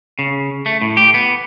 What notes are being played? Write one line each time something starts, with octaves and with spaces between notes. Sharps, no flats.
C#3
A3
A2
G4
B3